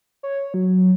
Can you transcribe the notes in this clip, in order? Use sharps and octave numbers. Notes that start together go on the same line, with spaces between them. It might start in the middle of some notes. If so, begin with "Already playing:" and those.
C#5
F#3